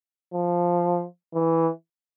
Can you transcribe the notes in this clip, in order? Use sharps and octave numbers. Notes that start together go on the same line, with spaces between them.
F3
E3